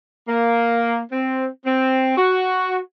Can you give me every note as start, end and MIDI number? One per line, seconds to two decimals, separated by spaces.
0.28 1.00 58
1.12 1.46 60
1.65 2.16 60
2.17 2.78 66